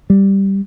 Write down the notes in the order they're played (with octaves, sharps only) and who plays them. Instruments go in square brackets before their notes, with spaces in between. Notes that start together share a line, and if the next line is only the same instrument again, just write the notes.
[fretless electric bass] G3